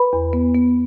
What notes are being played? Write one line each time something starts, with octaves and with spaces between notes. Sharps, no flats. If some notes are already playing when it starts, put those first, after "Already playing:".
Already playing: B4 B5
E2
B3
B3